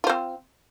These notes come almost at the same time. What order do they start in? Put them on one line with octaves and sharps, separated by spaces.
F4 C5 C4